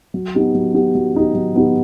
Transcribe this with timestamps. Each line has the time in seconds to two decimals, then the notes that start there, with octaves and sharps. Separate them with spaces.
0.14 F#3
0.35 B3 D#4 G4
0.55 F#3
0.74 B3 D#4 G4
0.95 F#3
1.15 B3 D#4 G4
1.35 F#3
1.55 B3 D#4 G4